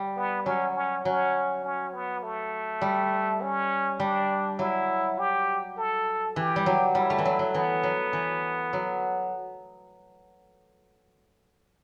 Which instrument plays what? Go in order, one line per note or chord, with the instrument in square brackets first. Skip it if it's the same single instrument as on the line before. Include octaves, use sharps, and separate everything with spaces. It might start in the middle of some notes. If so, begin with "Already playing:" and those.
Already playing: [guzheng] G3
[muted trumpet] B3
[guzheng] F#3 [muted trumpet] C#4
[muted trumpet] C#4
[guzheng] F#3 [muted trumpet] C#4
[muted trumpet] C#4
B3
A3
[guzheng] G3
[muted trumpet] C#4
[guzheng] G3 [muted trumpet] D4
[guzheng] F#3 [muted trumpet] E4
[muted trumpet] G4
A4
[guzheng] E3 [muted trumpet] G4
[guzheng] G3
F#3
[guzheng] G3 [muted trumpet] E4
[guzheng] A3
E3
F#3
F#3
[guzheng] E3 [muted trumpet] B3
[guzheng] F#3
E3
F#3